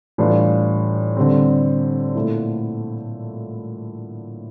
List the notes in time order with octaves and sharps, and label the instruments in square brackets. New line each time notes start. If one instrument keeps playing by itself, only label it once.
[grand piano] A2 E3 G3 D4 F4
D3 G3 C4
A#2 A3 E4